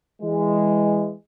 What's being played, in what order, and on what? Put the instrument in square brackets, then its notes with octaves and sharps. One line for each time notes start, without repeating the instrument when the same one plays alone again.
[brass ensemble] E3 G#3